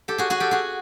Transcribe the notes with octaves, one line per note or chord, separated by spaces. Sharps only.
G4 A4
F#4 G#4
F#4 G#4
G4 A4
F#4 G#4